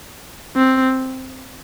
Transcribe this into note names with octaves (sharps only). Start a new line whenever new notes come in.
C4